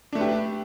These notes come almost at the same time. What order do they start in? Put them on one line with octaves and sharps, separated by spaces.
D4 A3 B4 G4